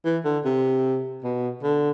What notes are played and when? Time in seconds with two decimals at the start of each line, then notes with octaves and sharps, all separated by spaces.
0.05 E3
0.25 D3
0.45 C3
1.23 B2
1.63 D3